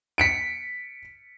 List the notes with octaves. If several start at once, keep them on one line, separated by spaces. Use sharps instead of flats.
B6 C#7 D7